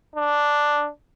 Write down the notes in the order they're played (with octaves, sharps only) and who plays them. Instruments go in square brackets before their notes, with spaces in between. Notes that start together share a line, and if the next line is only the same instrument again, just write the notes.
[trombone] D4